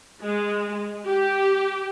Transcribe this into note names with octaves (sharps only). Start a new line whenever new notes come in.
G#3
G4